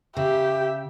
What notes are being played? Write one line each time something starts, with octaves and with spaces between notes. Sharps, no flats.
C#3 G4 E5